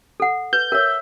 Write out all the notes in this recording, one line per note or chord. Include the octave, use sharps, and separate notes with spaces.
A4 F#5
B4 G6
A#4 C#5 E5